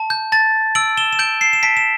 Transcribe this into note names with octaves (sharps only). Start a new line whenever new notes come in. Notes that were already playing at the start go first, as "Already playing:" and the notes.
Already playing: A5
G6
A5 A6
E6 D7 F#7
E7 G7
E7
G6 D7 F#7
C7 E7
E7
A5 B6 D7
E7